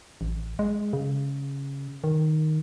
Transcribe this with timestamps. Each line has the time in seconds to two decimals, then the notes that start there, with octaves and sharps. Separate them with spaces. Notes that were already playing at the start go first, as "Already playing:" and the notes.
0.21 A1
0.59 G#3
0.93 C#3
2.04 D#3